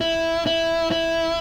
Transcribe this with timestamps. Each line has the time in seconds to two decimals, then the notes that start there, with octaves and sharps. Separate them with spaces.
0.01 E4
0.46 E4
0.91 E4